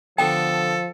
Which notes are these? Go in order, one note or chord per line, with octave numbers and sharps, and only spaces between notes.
D3 F3 B3 A4 G5 A5